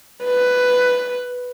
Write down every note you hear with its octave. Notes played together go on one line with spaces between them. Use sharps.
B4